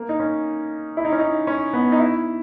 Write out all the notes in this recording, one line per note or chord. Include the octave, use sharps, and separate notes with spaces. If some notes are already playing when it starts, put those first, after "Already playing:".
Already playing: A#3
D#4
C#4
E4
D#4
C#4
D#4
C#4
B3
D#4
E4